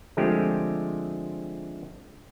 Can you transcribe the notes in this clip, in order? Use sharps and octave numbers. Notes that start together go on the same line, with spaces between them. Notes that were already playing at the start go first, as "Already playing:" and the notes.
D3 F3 G#3 A3 C4 G4